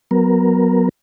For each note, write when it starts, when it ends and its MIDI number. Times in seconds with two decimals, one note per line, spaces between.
0.11 0.89 54
0.11 0.89 59
0.11 0.89 70